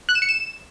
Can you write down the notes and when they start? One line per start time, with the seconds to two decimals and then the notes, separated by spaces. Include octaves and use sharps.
0.09 F#6
0.15 E7
0.22 C#7
0.29 E7